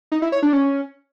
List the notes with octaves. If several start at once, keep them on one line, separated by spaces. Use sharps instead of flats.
D#4
E4
C#5
D4
C#4